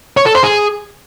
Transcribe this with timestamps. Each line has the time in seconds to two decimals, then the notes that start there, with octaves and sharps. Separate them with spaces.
0.17 C#5
0.26 A4
0.35 C5
0.44 G#4